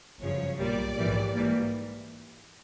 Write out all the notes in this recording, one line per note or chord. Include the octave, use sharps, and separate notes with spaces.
G1 F#2 C#3 F3 C#5
B1 A#2 G3 A#3 D5
A#1 G#2 E3 G3 A#3
G#2 E3 G3 A#3